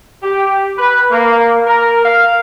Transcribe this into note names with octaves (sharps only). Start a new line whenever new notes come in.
G4
B4
A#3
A#4
F5